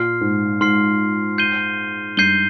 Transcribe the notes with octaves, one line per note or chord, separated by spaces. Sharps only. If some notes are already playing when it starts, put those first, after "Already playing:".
Already playing: A#2 C6 F6 C7
G#2
G#2 C6 F6 C7
G6 C7 D#7 G7
G2 G6 C7 D#7 G7